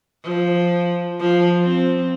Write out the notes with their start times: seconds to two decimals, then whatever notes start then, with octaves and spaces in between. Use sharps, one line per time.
0.23 F3
1.19 F3
1.63 C4